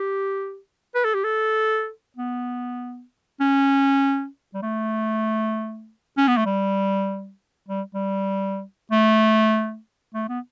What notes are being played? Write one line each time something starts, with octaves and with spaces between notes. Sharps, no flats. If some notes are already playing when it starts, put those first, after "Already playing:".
Already playing: G4
B4
A4
G4
A4
B3
C#4
G3
A3
C#4
B3
A3
G3
G3
G3
A3
A3
B3